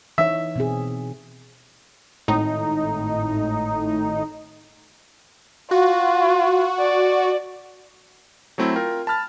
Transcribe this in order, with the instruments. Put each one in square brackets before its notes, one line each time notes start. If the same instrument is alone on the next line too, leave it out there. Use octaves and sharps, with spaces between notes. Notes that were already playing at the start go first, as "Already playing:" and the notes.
[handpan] E3 D#4 C#5 [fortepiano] E5
[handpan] B2 C4 G#4
[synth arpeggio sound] G#1 A2 D#4
[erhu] F4 [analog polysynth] F#4
[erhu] D5
[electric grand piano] F#3 A3 C4 E4
F4 A#4 G5
A5 B5 F6 A6